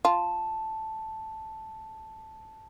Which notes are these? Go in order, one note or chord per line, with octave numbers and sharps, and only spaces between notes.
F4 A5